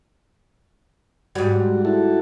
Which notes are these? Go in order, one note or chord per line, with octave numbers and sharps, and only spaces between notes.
G#2 G3 F#4
E4 F#4 A4